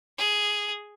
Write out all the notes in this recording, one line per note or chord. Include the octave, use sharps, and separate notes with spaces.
G#4